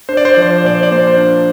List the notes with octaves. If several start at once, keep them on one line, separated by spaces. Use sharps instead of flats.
D4 C5
D5
C5
F3 D5
C5
D5
C5
A#2 D5
C5
D5
A#3 C5
D5
C5
D4